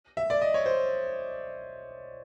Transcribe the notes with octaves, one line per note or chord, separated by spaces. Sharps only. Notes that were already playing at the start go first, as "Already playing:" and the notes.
E5
D5
D#5
C#5
C5